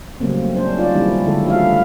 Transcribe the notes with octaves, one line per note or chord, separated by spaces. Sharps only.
C#3 F#3 G3 A3 A#3 C4
C#4 D4 C5
D#4 F4 D5
D#3 G3 A#3 C#4 E4
D3 F3 G#3 E4 A4
F3 A3 E4 F#4 E5 F5